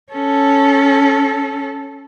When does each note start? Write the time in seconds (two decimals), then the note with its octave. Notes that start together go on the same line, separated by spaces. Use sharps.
0.12 C#4 A4